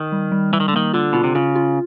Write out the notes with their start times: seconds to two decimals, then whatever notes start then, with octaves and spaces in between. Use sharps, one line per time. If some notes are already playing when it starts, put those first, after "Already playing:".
Already playing: D#3
0.12 G3
0.32 G3
0.52 E3 G3
0.60 D#3
0.68 D3
0.73 D#3 A#3
0.93 D3 F4
1.13 B2 F4
1.24 C3
1.35 C#3 F4
1.55 F4